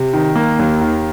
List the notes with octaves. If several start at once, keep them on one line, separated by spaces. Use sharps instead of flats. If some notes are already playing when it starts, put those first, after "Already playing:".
Already playing: C3
D#3
A#3
D#2
D#3